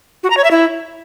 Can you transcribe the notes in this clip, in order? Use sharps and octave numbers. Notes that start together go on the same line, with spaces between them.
F#4
A#5
C#5
E5
E4